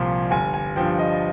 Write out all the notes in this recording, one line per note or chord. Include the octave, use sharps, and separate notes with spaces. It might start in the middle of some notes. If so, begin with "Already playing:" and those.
Already playing: C2 A#2 F3 C6
G1 G#5
G#5
G2 F3 G5
D#5